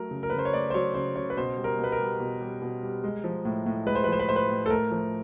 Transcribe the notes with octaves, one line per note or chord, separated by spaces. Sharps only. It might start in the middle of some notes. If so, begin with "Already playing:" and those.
Already playing: F#3 A3 A#4
C#3
A#4
B4
C#3
C5
C#5
A3 D5
C5
F#3 C#5
C#3 C5
C#3 C#5
B4
B2 C5
G3
A#4
B2 B4
A#4
G3
B2
G3
B2
G3
G#3
F3
A2
A2
G#3 B4
C5
B4
F3 C5
B4
A2 C5
B4
A2
A4
A3 A#4
F3